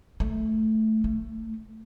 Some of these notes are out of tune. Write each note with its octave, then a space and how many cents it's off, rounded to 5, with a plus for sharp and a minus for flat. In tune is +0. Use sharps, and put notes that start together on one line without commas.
A3 -5
A3 +25